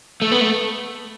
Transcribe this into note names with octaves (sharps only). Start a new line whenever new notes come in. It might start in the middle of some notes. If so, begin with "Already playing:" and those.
A3
B3
A3